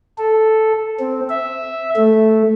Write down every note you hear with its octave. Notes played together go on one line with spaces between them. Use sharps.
A4
C4
E5
A3